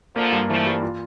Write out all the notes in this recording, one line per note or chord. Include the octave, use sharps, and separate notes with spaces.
D3 F3 A#3
G2
E3 F3 A3
G3
F4